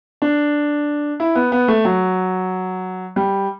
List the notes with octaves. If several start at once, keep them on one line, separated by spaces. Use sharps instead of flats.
D4
E4
B3
B3
A3
F#3
G3